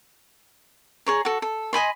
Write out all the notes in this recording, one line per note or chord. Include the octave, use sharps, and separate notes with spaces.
G#4 C#5 A#5
F#4 A4
A4
D#5 G#5 B5 C6